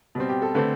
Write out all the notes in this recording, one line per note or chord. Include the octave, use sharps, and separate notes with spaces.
B2 G3 C4
G4
A4
D3 A3 C4 B4